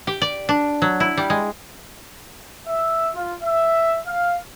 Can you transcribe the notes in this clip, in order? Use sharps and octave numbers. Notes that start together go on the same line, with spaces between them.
G4
D5
D4
F#3
E4
G3
G#3
E5
F4
E5
F5